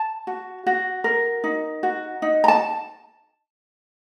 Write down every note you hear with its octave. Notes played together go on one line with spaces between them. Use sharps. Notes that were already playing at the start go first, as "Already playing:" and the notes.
Already playing: A5
F#4
F#4
A#4
D#4
F#4
D#4
A#5
A5